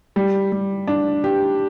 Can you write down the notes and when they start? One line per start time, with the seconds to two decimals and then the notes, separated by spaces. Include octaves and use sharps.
0.16 G3
0.52 G3
0.87 D4
1.24 G4